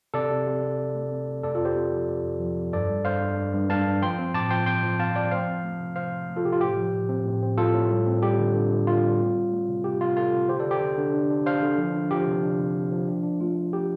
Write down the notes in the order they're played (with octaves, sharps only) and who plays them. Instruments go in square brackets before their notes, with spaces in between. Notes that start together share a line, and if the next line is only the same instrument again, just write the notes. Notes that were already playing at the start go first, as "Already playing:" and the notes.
[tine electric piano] C3 A4 D5
C3
C3
C3
C3
A3
C4
C3
F2 A4 D5
C4 F4 A4
G4 C5
C4
F3
F2
F2
F3
F2
G2 A4 D5
G3
G2 C5 F5
G2
G2
G2
G2 F5 A5
G2
F3 G5 C6
C4
A2 A5 D6
F3 G5 C6
C4 G5 C6
F3
C4 F5 A5
F3 D5 G5
A3 C5 F5
C4
A3
C3
C3 C5 F5
C3
A3
F4 A4
C3 G4
F4
A2 G4
F3
A2
C4
A2
C4
A2 F4 A4
A2
G3
C4
G3 G4
D3
D3
D3
D3 F4
G3
C4
C4
A3
C3
C3 G4
C3 F4
C3 F4 A4
C3
D3 G4 C5
A4 D5
D3
G4 C5
D3
D3
D4
D4
D4 C5 F5
D3
F3
D4
F3 G4
C3
D4
C3
C3
F3
D4
D4
A3 F4
D4
A3 G4